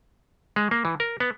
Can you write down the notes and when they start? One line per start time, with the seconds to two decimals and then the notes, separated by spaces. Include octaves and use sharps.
0.56 G#3
0.71 A#3
0.85 E3
1.00 A#4
1.20 B3